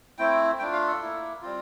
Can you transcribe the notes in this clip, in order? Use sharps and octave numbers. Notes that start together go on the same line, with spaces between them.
A3 C4 E4 G5
A3 D4 F4 G5
F5
A4
A#3 E4
G3 C4 F4